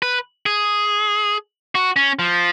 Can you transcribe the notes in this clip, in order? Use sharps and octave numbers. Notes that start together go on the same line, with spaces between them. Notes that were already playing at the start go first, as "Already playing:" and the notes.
B4
G#4
F#4
C#4
F3